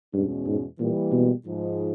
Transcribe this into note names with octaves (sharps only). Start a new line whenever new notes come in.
E2 G2 B2 G#3 C#4
G#2
A#2 E3 G3 A#3
B2
G#2 F3 G#3